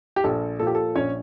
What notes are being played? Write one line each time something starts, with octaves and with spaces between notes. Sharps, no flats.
G4
A#1 A4
A#2 F3 A4
G4
A4
A#1 C#4 C#5